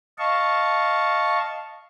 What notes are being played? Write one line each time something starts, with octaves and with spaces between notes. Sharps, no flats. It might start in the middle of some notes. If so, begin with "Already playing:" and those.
D#5 F5 A5 C#6